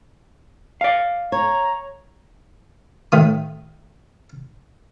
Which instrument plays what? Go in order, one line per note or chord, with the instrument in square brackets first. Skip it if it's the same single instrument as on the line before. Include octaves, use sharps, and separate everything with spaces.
[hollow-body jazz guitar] D5 F5
[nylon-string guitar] C#5 [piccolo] A#5
[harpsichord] A2 D#3 D#6